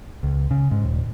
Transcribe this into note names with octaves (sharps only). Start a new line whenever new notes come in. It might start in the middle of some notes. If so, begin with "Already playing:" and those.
C#2
C#3
G#2
D#1